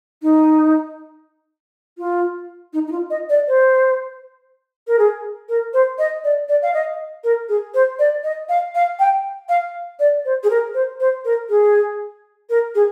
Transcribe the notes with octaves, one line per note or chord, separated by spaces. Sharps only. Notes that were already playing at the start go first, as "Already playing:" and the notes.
D#4
F4
D#4
D#4
F4
D#5
D5
C5
A#4
G#4
A#4
C5
D#5
D5
D5
F5
D#5
A#4
G#4
C5
D5
D#5
F5
F5
G5
F5
D5
C5
G#4
A#4
C5
C5
A#4
G#4
A#4
G#4